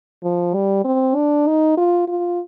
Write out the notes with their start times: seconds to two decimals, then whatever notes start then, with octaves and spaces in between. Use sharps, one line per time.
0.24 F3
0.54 G3
0.85 C4
1.16 D4
1.47 D#4
1.78 F4
2.08 F4